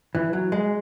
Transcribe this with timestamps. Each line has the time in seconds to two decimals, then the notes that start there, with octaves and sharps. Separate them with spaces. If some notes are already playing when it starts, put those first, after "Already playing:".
0.15 E3
0.33 F#3
0.52 G#3